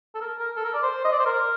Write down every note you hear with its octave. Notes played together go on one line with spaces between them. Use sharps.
A4
A#4
A#4
A4
A#4
D5
C5
D#5
D5
C5
A#4